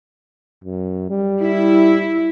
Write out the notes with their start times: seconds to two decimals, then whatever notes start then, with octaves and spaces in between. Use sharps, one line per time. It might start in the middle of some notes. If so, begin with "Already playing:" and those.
0.64 F#2
1.10 G3
1.41 E4